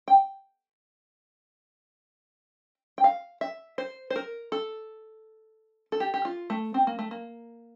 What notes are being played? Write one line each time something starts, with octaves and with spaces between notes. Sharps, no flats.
G5
G5
F5
E5
C5
C5
A#4
A4
A4
G4
G4
F4
A3
C4
A#3
A3
A#3